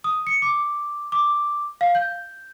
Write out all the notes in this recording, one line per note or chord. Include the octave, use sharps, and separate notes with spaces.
D#6
C#7
D6
D6
F5
G6